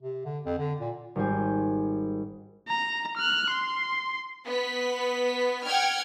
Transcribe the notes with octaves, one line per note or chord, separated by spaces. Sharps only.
C3
D3
F2
D3
A#2
G#1 G3 C#4 C5 G5 G#5
A#5
F6 F#6
C6
B3 B6
F#5 G5 F6 G#6